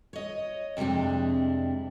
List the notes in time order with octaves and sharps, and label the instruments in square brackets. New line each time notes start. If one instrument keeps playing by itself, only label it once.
[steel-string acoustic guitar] C#5 D#5
F2 C3 G3 G#3 D4